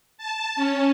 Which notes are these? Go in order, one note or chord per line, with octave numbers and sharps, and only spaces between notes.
A5
C#4